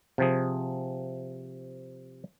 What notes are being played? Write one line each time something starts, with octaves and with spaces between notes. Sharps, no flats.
C3 F3 G#4